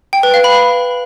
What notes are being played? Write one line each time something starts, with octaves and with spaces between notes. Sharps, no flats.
G5
B4
F5
B5